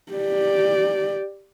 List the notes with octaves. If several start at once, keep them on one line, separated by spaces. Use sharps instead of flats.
G4 D5